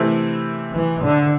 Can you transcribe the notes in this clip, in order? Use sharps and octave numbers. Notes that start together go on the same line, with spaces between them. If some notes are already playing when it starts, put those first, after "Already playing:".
Already playing: C3 E3 A3 C4 E4
E3
D3